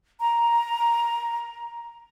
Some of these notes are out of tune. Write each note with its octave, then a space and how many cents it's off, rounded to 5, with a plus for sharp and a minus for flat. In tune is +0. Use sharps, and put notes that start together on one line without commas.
A#5 +10